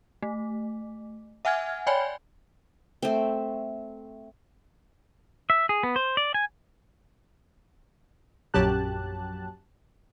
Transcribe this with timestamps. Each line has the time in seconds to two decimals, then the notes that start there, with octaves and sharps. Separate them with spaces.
0.23 A3
1.45 E5 F#5 G#5 F6 G#6
1.87 C#5 D5 G5 G#5 B5
3.02 A3 C4
5.50 E5
5.69 G#4
5.83 B3
5.96 C5
6.17 D5
6.34 G#5
8.54 A#1 F#2 F#3 G4 A5 F#6